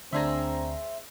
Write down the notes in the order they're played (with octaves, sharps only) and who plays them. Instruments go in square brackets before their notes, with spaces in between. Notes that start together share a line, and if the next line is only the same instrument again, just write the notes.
[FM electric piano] D2 D4 A#5 [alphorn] C4 [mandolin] G#4 C5 E5